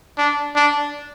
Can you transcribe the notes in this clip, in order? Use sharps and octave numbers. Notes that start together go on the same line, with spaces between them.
D4
D4